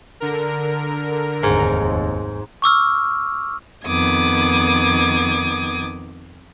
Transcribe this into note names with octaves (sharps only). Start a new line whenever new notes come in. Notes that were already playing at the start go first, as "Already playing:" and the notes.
D3 A#4
F1 D#2 G#2
C#6 D6 E6 F6
F2 D#3 B3 D6 D#6 G#6